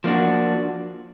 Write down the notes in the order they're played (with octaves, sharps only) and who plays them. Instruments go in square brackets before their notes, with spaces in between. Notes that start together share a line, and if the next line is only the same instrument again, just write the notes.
[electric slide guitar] F3 A#3 D4 F#4